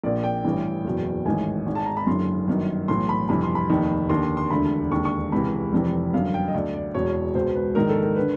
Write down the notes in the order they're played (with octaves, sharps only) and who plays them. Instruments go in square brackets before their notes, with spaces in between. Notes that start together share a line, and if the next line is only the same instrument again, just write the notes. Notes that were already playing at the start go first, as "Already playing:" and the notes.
[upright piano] A#1 A#2 D5
G5
A1 G2 E3
F#1 E2 B2
A1 G#2 D#3 G#5
G#1 G#2 D#3
A5
A#5
B5
F#1 F#2 D3 C6
G1 F#2 D#3
B1 A2 E3 C6
B5
G1 F2 C3 E3 B5
C6
B5
F1 D#2 D#3
D#2 D3 C6
C6
C6
E1 D2 D3 B5
E1 D#2 D3 C#6
C#6
C#2 C3 E3 B5
F1 F2 C3 E3
G1 F#2 D3 F5
G5
D#5
D2 D3 D5
D5
E1 E2 B2 C#5
C#2 B2 C5
B4
A#1 G#2 D#3 A#4
A4
A#4
D3 B4